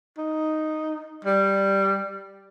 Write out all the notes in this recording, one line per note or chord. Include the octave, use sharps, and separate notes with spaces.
D#4
G3